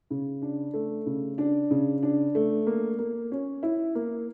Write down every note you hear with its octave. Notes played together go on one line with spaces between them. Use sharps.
C#3
D4
A3
C#3
D4
C#3
D4
A3
A#3
A#3
C#4
E4
A#3